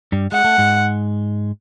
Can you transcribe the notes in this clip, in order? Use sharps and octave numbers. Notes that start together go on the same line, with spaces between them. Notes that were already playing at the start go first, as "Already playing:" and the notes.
G2 G3
G#3 F#5
A3
G#2 G#3